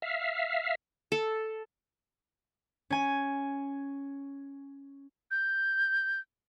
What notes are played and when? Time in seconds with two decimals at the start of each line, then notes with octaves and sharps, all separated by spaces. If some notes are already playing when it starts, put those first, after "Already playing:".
0.02 E5 F5
1.12 A4
2.90 C#4 G#5
5.31 G6